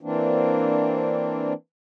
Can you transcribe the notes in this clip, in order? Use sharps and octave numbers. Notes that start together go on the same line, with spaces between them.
E3 A#3 C4 D4